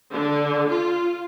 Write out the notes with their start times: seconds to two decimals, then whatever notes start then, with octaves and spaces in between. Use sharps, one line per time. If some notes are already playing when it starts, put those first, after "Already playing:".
0.11 D3
0.69 F4